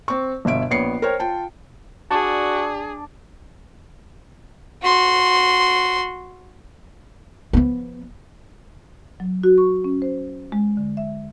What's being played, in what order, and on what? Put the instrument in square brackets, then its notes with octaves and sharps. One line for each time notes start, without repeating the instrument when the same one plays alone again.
[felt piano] C4 C#6
G1 B2 E5 D7
A#1 B3 C#5 C7 C#7
A#4 C5 C#5 G5
F4 G5 A5
[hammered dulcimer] D4 D5 [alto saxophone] F#4 [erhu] G#4 [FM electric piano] A5
[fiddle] F#4 C6
[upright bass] F3 B3
[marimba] F#3
F#4
C#6
C#4
C5
G#3
D3
E5